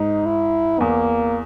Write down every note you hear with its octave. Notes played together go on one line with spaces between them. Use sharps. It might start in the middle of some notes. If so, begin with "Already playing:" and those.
Already playing: G#2 D#4
E4
E2 A#3